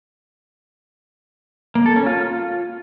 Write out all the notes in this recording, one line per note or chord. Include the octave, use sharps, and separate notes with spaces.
A#3
A4
C#4
F4